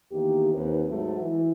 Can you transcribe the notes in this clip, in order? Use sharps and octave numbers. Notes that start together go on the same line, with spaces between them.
E2 D#3 A#3 G4
D#2 C4 B4
G#2 F#3 A3
E3